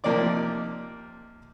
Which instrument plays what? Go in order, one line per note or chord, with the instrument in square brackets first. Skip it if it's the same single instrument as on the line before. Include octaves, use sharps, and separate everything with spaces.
[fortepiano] C3 F3 A#3 D#4 D5 D6